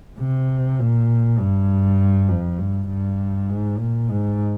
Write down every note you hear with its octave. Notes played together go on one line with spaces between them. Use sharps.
C3
A#2
G2
F2
G2
G2
G#2
A#2
G#2